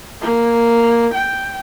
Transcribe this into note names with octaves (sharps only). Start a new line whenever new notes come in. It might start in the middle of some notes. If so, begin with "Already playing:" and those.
A#3
G5